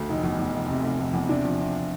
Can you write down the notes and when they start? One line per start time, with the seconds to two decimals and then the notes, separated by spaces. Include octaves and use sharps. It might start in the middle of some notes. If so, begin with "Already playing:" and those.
Already playing: D2
0.09 F1 D#4
0.23 E2
0.38 E2
0.54 F1
0.69 C3
0.84 F1
0.99 F1
1.13 E2
1.29 C3 D4
1.44 F3
1.59 C3